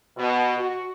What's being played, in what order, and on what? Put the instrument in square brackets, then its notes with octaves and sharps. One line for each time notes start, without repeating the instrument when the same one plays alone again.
[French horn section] B2
F#4